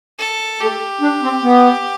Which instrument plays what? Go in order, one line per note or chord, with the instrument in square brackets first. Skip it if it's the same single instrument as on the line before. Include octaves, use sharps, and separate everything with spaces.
[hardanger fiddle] A4
[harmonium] A3 [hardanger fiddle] G4
[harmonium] D4
C4
B3